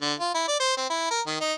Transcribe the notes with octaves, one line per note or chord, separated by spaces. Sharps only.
D3
F4
E4
D5
C5
C4
E4
A#4
D#3
D#4